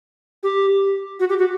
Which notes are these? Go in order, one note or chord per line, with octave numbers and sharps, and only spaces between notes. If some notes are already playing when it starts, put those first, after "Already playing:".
G4
F#4
G4
F#4